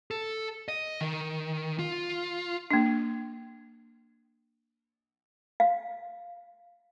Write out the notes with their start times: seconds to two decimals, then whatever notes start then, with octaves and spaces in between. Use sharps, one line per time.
0.11 A4
0.68 D#5
1.01 D#3
1.79 F4
2.71 A#3 D4
5.60 F5